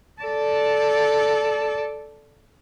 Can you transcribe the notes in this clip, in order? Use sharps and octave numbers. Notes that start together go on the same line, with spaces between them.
A4 D5